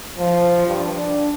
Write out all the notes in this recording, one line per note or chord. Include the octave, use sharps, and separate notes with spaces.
F3
G2
D4